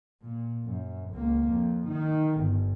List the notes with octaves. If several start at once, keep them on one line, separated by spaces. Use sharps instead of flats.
A#2
F#2
C#2 A#3
F2
D#3 D#4
G1 G2